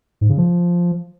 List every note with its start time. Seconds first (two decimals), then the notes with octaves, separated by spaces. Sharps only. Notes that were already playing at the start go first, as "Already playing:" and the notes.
0.21 G#2
0.29 C#3
0.38 F3